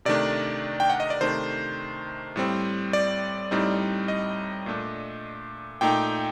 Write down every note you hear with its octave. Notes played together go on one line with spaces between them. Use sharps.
C3 D#3 A3 D4 D5
G5
F#5
D#5
D5
C3 D#3 A3 D4 C5
A2 G3 C4
D5
A2 G3 C4 D#4
D#5
A#2 A3 D4
A#2 A3 D#4 G5